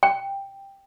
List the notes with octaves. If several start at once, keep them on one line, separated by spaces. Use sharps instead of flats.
G5